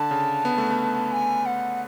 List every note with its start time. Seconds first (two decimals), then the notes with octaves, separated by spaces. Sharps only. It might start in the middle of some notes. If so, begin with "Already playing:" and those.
Already playing: D3 A5
0.11 C#3
0.45 B3
0.58 A3
0.71 B3
1.12 G#5
1.46 F#5